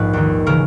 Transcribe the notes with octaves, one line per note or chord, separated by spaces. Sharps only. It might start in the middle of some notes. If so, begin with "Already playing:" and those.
Already playing: A#1 G#2 B4
D#2 D#3
C#3 E3 A#4